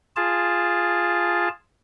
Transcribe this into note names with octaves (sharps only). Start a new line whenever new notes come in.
F4 G#4 A5